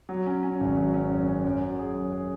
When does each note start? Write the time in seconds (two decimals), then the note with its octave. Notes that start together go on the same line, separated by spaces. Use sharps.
0.09 F#3
0.26 C#4
0.43 C#4
0.60 G#1
0.77 F#3
0.94 C#4
1.11 F#2
1.28 C#4
1.44 F#2
1.61 F#3
1.79 G#4
1.95 F#2
2.12 G#4